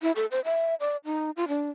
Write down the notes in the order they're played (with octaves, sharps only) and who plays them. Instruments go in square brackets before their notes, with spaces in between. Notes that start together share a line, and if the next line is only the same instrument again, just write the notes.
[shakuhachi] E4
A4
C5
E5
D5
D#4
F4
D4